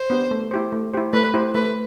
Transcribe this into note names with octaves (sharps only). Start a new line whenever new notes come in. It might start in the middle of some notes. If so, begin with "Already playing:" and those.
Already playing: C5
B3 D4 G4
A3
E4 G4 C5
A3
E4 G4 C5
A3 B4
E4 G4 C5
A3 B4